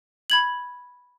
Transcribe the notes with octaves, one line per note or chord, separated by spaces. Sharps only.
B5 G#6 F#7